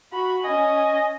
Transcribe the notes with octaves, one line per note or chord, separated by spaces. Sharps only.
F#4 B5
C#4 D#5 G#5